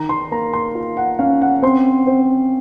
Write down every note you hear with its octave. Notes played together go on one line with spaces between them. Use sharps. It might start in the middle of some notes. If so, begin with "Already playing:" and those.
Already playing: D#3 A#5
C6
A#3 A#5
C6
F4
F#5
C#4 F5
F#5
C4 C6
C4